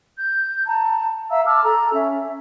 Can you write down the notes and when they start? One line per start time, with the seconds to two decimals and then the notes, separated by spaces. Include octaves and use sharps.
0.17 G6
0.67 A5 A#5
1.31 E5 F5 A#5 E6
1.45 A5 D6 E6 F6
1.64 A4 A#5
1.94 C#4 E5